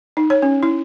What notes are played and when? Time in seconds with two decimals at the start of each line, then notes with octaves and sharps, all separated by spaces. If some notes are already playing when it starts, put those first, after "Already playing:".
0.17 D#4
0.30 C#5
0.42 C#4
0.63 E4